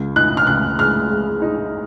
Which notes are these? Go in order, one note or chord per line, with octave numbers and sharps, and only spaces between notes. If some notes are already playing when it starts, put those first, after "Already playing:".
Already playing: C#2
D#4 F#6
F6
C#2 F#6
G#3 F6
G#3
D#4